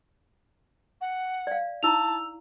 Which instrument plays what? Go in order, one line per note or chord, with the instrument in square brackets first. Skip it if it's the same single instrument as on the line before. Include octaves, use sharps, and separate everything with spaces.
[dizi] F#5
[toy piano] D5 F5
[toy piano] D#4 E4 A#5 [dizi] A5 [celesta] E6 F7